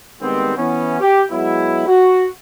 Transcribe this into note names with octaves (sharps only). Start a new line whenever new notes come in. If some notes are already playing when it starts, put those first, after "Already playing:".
D#3 G3 G#3 B3 C4
E3 B3 C#4
G4
F#3 G#3 B3 E4
F#4